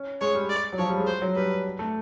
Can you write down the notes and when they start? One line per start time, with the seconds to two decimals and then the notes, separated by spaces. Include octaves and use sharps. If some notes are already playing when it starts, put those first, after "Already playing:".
Already playing: C#4
0.21 G#3 C#5
0.35 G3
0.49 D5
0.73 F#3
0.78 F3 C#5
0.88 G3
0.98 G#3
1.07 C5
1.22 F#3
1.36 G3 B4
1.79 A3